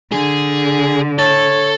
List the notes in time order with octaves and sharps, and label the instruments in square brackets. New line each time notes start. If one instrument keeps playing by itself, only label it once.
[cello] D3 [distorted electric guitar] G#4
[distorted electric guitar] A4 [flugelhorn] C#5 [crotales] A6